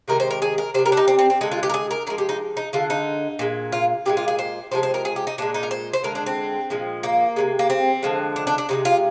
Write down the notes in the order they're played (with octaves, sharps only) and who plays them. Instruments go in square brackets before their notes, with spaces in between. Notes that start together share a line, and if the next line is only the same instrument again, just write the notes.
[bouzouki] C3 D#3 G#3 A#4
C5
A#4
G#4
A#4
C3 C5
G3
A#4
D4
D#4
C4
C4
C4
D3 G#3 D#4
F4
G4
A#4
G#4
A#4
D3 F3 G#3 A#4
G4
D#4
D#4
D3 G#3 F4
D#4
A#2 G#3
F4
A#2 F3 G#3 G4
F4
G#4
C5
C3 F3 G#3 C5
C5
A#4
G#4
G4
D#4
A#2 F3 G#3 D4
D#4
A#4
C5
C5
D3 G#3 A#4
D4
C4
A#2 F3 G#3
A#3
C3 D#3 G#3
A#3
C4
D3 F3 G#3
D4
D4
D4
C3 F3 G#3 D#4
F4